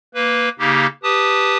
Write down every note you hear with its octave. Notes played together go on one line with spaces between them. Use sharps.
A#3 B4
C#3 A#3 D#4 G4
G4 B4 A5 D#6